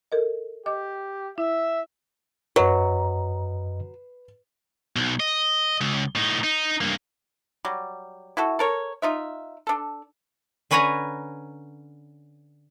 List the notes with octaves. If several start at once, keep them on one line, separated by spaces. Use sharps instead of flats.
A4 A#4 D#5
G4 D#5 D6
E4 E5
F#2 F#3 B4 D#5
B1
D#5
C#2
A2 D#4
D#4
G2 A#3
F#3 G3
E4 F#4 A4
A4 A#4 C#5
D#4 F4 E5
D4 A4
D3 C#4 B4 C#5 G#5 A#5